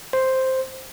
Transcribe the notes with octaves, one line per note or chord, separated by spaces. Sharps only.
C5